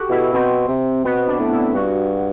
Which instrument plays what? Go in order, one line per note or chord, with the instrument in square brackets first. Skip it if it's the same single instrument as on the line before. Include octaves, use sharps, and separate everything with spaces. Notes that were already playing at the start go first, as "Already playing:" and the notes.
Already playing: [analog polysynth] F#4 G4 A4
[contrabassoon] B2 [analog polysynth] E4
[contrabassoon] B2 [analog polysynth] C4
[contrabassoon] C3
[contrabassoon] B2 [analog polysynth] B3
[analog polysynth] D4
[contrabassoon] A2
[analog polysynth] E4
[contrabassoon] G2 [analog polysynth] F#4